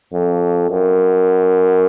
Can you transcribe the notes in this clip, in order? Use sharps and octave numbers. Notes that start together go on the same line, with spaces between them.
F2
F#2